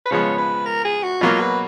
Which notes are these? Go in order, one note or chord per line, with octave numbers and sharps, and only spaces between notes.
B4
C#3 F3 G#3 B3 C#5
B4
A#4
G#4
F#4
B2 F#3 A#3 F4
B4